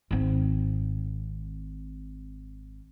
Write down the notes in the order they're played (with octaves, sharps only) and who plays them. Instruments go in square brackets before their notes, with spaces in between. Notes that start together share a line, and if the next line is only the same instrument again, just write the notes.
[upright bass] G#1 C4